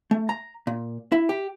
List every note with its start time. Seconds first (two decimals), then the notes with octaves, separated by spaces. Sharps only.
0.11 A3
0.29 A#5
0.67 A#2
1.12 E4
1.29 G4